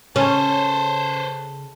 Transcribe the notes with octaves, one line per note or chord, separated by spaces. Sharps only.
C#3 C#4 A4 B4 C5